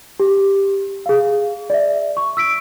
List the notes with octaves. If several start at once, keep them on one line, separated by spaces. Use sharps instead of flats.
G4
G#4 F5
D5 E5
C#6
E6 B6 D7